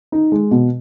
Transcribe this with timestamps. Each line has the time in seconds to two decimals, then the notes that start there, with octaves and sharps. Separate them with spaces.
0.12 D#4
0.32 G#3
0.51 B2